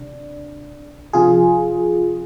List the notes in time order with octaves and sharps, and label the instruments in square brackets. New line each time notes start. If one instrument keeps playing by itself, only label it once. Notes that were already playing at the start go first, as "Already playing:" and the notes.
Already playing: [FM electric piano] C3 D4
C3 F3 F4 G#4